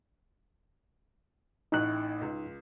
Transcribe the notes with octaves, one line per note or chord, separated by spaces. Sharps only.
A1 A2 D#4 F#6
C#2